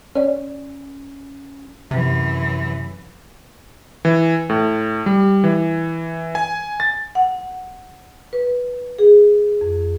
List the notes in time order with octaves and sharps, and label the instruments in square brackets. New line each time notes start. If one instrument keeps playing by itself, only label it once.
[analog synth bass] C#4 [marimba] C#5 D5
[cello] F#2 E3 [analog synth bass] C3
[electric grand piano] E3
A2
G3
E3
G#5
A6
[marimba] F#5
B4
G#4
F2